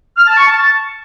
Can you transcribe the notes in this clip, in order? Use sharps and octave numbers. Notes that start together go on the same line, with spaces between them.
F6
A5
C#6
A5